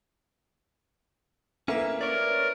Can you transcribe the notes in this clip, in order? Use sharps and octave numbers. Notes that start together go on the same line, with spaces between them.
A3 A#3 C#4 E4 B4 E5
A#4 C#5 D5